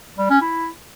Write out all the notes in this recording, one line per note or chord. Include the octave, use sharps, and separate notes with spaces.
G3
C#4
E4